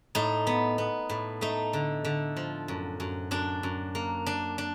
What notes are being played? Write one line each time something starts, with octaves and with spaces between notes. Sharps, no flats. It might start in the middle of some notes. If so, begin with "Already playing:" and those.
A2 D#4
B3
B3
A2
A3 D#4
D3
D3
F3
F#2
F#2
F#2 D4
F#2
A#3
D4
D4